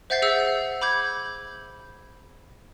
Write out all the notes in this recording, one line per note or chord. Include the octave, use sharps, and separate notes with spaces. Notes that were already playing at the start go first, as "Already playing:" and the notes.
C5 E5 F#5 G6 A6 C7
G#4 E5 F#5 E6 G6
B5 D6 G6 G#6